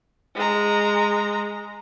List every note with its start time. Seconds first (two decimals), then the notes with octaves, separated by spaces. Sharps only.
0.35 G#3 A#5